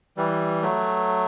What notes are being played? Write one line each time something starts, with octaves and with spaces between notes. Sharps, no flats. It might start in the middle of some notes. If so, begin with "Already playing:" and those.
E3 G3
F#3 A3